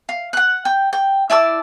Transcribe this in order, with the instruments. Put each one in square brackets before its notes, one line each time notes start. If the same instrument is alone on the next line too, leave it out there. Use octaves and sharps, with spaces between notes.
[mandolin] F5
F#5 F#6
G5
G5
E4 D5 A5 E6